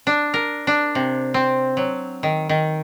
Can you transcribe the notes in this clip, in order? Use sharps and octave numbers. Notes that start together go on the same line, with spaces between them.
D4
A#4
D4
C3
C4
F#3
D#3
D#3